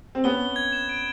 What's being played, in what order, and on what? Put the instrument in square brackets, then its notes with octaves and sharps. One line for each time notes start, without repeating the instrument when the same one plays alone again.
[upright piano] C4
[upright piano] B3 C#4 [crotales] G7
[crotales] G7
G#6
E7
D7